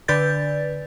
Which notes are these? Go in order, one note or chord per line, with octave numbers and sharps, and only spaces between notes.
D3 B4 D5 G6 A6